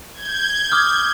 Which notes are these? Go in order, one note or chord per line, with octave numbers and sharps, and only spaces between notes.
G6 G#6
D6 D#6 F6